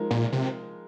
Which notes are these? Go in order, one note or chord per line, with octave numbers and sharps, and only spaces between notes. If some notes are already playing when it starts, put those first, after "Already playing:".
Already playing: F3 G#3 D#4 A#4
A#2
C3